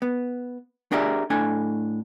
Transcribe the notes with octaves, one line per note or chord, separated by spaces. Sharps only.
B3
D4 G4 G#4 A#4 D5 E5
A2 D4 A4 G#5